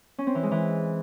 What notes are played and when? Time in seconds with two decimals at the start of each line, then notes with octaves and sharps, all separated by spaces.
0.18 C#4
0.27 C4
0.35 E3
0.43 G#3
0.51 E3